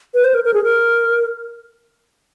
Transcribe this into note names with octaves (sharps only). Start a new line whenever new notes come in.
B4
C5
A#4
A#4
G#4
A#4